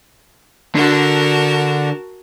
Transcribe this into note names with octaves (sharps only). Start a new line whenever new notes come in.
D3 F#4 A#4 A5